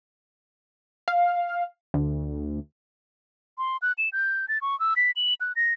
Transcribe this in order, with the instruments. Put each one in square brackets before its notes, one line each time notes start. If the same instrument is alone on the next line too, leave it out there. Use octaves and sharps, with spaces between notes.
[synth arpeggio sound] F5
D2
[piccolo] C6
F#6
E7
G6
A6
C#6
E6
B6
F#7
F#6
A#6